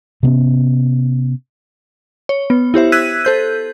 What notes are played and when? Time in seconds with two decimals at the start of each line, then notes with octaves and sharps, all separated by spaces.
0.23 C3 B3 C#4
2.29 C#5
2.50 B3
2.74 E4 G4 C5 E5
2.92 E6 F#6 G#6 B6 D#7
3.25 A4 C5 G6